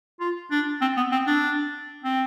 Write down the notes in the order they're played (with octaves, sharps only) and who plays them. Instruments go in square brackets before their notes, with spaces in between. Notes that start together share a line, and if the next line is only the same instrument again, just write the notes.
[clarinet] F4
D4
C4
B3
C4
D4
C4